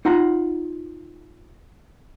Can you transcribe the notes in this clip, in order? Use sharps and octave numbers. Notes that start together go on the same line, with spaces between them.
D#4 F4 F#5 A#5